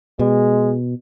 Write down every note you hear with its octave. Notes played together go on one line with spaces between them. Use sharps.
B2 G#3